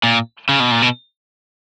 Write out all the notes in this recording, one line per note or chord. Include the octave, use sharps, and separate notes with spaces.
A#2
C#3
B2
A#2
B2